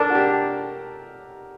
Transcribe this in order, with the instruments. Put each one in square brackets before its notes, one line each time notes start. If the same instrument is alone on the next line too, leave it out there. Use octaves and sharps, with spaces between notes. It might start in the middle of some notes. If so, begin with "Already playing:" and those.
Already playing: [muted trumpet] D4 [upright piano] A4 A#4 D5
[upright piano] F#4
G4